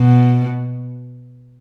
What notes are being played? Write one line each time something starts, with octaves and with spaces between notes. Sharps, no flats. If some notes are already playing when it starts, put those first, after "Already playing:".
Already playing: B2